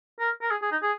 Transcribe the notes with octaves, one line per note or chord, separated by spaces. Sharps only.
A#4
A#4
G#4
G#4
D#4
G#4